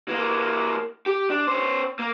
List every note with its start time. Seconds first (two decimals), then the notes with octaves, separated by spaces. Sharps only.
0.08 E3 A#3
1.06 G4
1.30 D4
1.47 C#4 C5
1.99 A#3